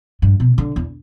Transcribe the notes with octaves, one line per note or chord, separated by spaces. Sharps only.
G2
B2
D3
E2